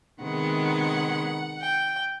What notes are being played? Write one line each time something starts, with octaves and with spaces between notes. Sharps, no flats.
C3 D#3 G#3 B3 F#5
G5